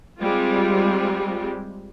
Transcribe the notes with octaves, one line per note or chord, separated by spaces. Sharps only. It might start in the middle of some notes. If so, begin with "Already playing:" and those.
G3 G#3 C4 F4